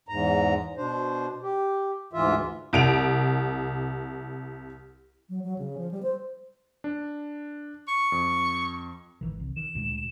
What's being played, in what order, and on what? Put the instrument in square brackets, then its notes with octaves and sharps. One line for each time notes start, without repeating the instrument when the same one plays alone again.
[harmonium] E2 G#2 A#5
B2 D4 C5
G4
D2 G#2 E3 F4 E5
[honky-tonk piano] C2 D7 F7
[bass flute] F#3
F#3
C#3
F3
G3
C5
[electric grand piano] D4
[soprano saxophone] C#6
[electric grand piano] F2
[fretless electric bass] G#1 D#3 E3
C2
[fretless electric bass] D#3 [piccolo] E7
[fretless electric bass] D2 A#2 G#3